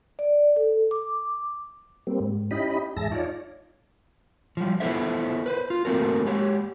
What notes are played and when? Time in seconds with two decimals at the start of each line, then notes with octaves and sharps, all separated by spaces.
0.19 D5
0.56 A4
0.91 D6
2.07 G3 A#3 C4
2.20 G#2
2.51 C#4 D#4 E4 G4 D#5 B5
2.96 E2 G#2 G#4 E5 A5 A#6
3.11 D#4 F4 C#5 D5
4.57 F3 G3
4.80 B3 E4 F4 A4 C5 E5
5.46 B4 C5
5.70 F4
5.85 A3 A#3 C4 F#4 A#4
6.25 G#3 G4 C#5